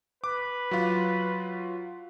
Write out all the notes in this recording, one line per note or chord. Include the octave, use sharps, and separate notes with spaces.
B4 D6
F#3 F4